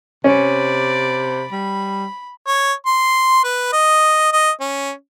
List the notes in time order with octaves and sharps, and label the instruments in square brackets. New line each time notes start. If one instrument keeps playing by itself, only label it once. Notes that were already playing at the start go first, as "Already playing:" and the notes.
[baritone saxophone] C3 [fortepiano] C#4 [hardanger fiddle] D5 B5
[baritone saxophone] G3 [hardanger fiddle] B5
[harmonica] C#5
C6
B4
D#5
D#5
C#4